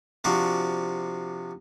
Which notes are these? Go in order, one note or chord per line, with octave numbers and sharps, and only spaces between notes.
C3 F3 D4 F#4